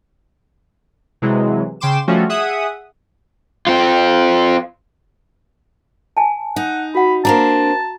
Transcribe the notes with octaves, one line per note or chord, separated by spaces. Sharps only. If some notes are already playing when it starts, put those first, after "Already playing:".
C3 E3 F#3 G#3
C#3 G5 C6 D6 E7
F3 G3 A3 C#4 F4 F#4
G#4 E5 F#5 D#6
C4 F4
G#5 A5
D#4 F#5
F#4 F#5 B5
A#3 C4 D4 A5 A#5